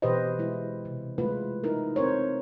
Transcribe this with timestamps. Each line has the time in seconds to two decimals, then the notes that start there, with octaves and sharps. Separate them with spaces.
0.02 B2 E3 G4 B4 C5 D#5
0.39 G#3 E4
0.85 C3
1.18 G#3 A3 E4 F4 B4
1.64 D#4 E4 A#4
1.96 C4 A#4 C5 C#5